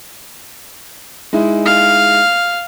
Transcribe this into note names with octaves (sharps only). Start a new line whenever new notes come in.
G#3 D#4 E4
F5